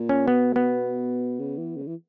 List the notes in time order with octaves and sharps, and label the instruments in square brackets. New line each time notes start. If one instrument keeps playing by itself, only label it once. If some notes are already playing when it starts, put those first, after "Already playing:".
Already playing: [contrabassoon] A#2
[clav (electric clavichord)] C#4
[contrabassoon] B2 [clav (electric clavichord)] B3
[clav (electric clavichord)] B3
[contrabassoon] C#3
E3
C#3
E3